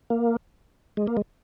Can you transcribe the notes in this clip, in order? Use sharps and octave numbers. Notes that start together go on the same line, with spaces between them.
A#3
G#3
A#3
G#3